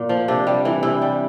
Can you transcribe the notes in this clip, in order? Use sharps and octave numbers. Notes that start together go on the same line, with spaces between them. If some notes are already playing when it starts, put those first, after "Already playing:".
Already playing: A#2
F3
C3 D4
G3
E3
C3 E4
G3